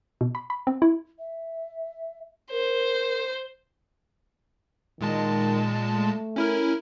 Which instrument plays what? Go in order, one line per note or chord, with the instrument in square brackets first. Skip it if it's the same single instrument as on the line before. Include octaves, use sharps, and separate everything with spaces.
[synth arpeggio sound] B2
B5
B5
C4
E4
[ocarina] E5
[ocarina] A#4 [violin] C5
[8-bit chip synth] A#2 G#3 A5 [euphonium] D#3
[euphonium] A3
[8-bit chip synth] C#4 E4 A#4